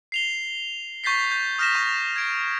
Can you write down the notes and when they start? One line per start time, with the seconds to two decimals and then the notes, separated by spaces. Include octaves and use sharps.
0.12 C7 F7 G7
1.04 C#6 G6 A6 B6 C7
1.32 G6
1.59 D#6 F6 G6 A#6 B6 E7
1.75 C#6 A#6
2.16 G#6 D7